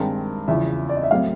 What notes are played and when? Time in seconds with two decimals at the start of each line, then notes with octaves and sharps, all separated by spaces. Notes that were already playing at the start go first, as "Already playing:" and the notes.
Already playing: G2 D#3 G#3 C4 A#4
0.48 E2 C#3 F3 E5
0.89 D5
0.96 D#5
1.03 E5
1.11 A2 F#3 A3 C4 E4 F5